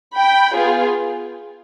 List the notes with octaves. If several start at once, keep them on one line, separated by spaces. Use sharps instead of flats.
G5 B5
B3 F4 G#4